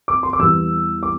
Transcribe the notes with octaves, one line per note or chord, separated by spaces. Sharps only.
D6
C6
D6
E2 E3 G3 E6
D6